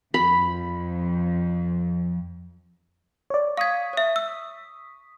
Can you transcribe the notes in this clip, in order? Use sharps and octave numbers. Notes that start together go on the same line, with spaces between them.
F2 B5
C#5 D5
F5 C#6 D#6 G#6 B6
C#5 E5
E6